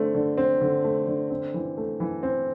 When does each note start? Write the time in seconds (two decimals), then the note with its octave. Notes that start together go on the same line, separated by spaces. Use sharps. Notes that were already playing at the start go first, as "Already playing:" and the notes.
Already playing: D3 A3 C4
0.14 D3
0.38 C4
0.61 D3
0.84 A3
1.07 D3
1.30 C4
1.54 E3
1.77 A3
2.00 E3
2.23 C4